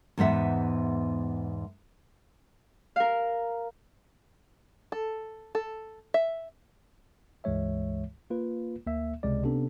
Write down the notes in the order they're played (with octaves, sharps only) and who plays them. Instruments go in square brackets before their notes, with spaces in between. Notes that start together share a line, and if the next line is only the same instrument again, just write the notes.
[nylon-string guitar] E2 G#2 B3 E5
[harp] A#4 F5
[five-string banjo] A4
A4
E5
[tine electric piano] C#2 G2 E3 G#3 C#5 E5
A#3 F4 B4
D2 A#3 E5
C#2 C3 G#3 D5
C3 B3 C#4 D4 A4